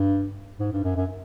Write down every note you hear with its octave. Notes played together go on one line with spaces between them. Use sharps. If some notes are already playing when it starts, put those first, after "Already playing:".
Already playing: G2
G#2
G2
F#2
F#2